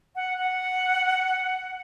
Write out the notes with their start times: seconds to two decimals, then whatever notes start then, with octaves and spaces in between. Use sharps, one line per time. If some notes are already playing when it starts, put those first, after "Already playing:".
0.15 F#5
0.38 F#5